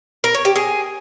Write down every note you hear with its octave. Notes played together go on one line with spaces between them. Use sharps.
A#4
C#5
G4
G#4